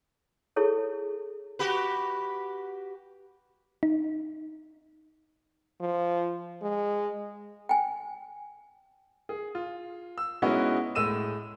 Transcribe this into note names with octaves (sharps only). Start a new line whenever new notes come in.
E4 G#4 A4 C#5
F#4 G4 B4
D#4
F3
G#3
G5 G#5
G#4
F4
E6
G#3 B3 C#4 D#4 E4 F#4
A2 G#3 E6 D#7 E7